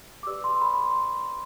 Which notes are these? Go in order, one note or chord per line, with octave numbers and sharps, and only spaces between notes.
D6
G4 B4 D5 E6
C6
B5
C6